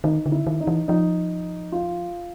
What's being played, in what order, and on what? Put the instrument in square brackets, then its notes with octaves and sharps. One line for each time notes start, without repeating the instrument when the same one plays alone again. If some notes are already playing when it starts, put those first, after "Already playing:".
[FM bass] D#3 [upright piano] D#4
[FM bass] D3
[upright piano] E4
[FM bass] D#3
[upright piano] D#4
[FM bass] E3
[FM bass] F3 [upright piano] D#4
[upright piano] F4